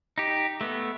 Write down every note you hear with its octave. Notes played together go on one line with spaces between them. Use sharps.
D#4 G4
A3 B3